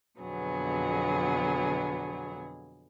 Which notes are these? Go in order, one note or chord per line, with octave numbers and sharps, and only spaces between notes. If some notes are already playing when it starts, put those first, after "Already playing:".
F2 B2 D3 F#3 B3 G#4